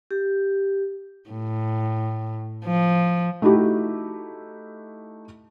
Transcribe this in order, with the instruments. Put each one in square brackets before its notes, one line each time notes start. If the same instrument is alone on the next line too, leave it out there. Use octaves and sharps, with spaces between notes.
[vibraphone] G4
[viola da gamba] A2
F3
[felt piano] A3 D#4 E4 F#4 G4